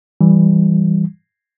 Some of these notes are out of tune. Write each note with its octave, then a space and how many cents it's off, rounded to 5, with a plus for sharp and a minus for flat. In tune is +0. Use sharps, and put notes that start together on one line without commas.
E3 +0 G3 +0